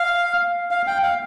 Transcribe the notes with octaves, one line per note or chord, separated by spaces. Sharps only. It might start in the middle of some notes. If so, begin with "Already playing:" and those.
Already playing: F5
F5
G5
F5